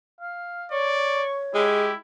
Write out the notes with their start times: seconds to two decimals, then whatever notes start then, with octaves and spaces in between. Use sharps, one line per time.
0.21 F5
0.72 C#5 D5 C#6
1.54 G#3 E4 G4